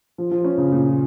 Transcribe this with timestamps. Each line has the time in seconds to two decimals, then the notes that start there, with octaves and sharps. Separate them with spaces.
0.18 F3
0.31 F3
0.44 C#4
0.58 C#3
0.72 A#2